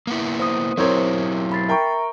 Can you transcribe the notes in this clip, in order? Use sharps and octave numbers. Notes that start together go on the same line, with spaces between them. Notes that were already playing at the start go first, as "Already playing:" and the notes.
A#3 B3 E4
C5 D#6
F#3 C4 E4 G4 A#4 C#5
B5 A6 C7
A#4 E5 G5 A#5 C#6